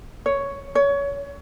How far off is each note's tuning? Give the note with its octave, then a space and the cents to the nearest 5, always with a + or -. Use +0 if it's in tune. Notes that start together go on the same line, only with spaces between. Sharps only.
C#5 +5
C#5 +25